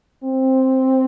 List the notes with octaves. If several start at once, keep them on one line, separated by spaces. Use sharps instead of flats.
C4